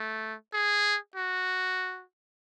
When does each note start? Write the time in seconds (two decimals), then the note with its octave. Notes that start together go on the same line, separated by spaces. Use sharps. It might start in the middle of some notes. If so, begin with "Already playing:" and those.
Already playing: A3
0.53 G#4
1.15 F#4